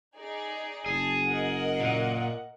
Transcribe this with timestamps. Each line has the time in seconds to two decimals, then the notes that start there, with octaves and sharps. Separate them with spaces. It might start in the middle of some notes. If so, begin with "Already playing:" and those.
0.14 D#4 G#4 D5
0.86 F#1 G#4 A5
1.25 A#4 D#5 F#5
1.80 A#2